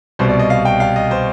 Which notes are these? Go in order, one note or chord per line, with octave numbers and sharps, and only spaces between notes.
C2 B2 G3 C5
D5
D#5
F5
G5
F5
D#5
C5